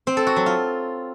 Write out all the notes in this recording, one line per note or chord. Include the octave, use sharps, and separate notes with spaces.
C4
A4
F#4
F#3
F4